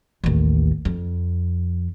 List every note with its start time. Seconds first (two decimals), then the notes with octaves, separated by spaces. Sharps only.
0.24 A1 D#2
0.85 F2